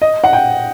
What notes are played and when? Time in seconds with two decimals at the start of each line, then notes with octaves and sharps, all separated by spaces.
0.02 D#5
0.24 F#5
0.33 G5